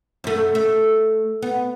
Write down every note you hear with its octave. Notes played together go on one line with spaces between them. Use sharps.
F#2 A3
A3
B3